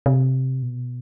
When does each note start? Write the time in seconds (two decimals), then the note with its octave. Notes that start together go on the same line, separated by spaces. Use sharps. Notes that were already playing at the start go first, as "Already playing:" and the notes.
0.06 C3
0.63 B2